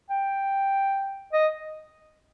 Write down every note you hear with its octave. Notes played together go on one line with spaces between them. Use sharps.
G5
D#5